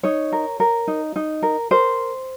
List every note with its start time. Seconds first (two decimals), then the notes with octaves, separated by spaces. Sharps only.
0.03 D#4 C#5
0.32 A#4
0.60 A#4
0.88 D#4
1.16 D#4
1.42 A#4
1.71 A#4 C5